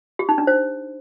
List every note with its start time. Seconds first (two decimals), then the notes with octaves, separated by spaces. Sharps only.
0.19 G4
0.29 D#4
0.38 D4
0.47 C5